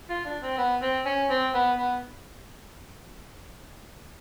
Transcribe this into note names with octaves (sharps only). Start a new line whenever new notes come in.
F4
D4
C4
B3
C4
C#4
C4
B3
B3